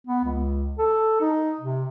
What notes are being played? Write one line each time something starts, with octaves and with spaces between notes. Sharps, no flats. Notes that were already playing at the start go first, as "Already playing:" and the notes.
B3
C#2
A4
D#4
C3